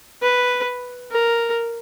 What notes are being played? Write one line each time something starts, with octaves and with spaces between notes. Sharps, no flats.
B4
A#4